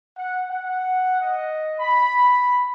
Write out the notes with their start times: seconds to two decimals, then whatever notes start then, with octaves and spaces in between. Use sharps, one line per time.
0.17 F#5
0.50 F#5
1.21 D#5
1.79 B5